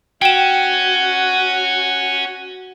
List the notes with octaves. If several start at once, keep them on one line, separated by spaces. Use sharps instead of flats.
C#4 F#4 G5 E7